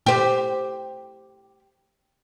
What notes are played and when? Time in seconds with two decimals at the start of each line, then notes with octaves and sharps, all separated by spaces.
0.06 G4 C5